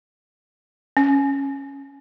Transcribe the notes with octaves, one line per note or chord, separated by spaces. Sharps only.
C#4